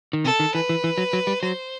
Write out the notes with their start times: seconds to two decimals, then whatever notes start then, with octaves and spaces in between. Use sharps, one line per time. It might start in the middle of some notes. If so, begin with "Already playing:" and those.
0.13 D#3
0.24 C3 A4
0.40 D#3
0.54 E3 B4
0.69 E3
0.84 E3
0.98 F#3
1.13 F#3
1.27 G3
1.42 F#3 C5